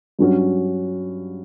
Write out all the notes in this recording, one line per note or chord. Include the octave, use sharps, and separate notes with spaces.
G2 F#3 C#4 F#4